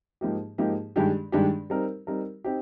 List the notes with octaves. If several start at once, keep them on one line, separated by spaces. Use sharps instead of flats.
G#2 F3 A#3 D#4 G4
G#2 F3 A#3 D#4 G4
G2 D#3 G#3 D4 G4
G2 D#3 G#3 D4 G4
G3 C4 D#4 A#4
G3 C4 D#4 A#4
C4 D#4 G4